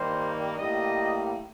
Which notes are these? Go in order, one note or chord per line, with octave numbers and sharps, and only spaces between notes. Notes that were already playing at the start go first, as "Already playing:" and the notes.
Already playing: G2 D#3 G3 A#3 C5
A2 G3 A#3 D#5